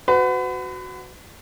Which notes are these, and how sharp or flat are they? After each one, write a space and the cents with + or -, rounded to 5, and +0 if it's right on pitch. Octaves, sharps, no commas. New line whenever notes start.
F#4 +0 B4 +40